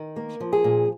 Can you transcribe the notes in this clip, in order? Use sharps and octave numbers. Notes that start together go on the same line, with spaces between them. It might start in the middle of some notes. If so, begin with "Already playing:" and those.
Already playing: D#3
A#3
F3
G#4
A#2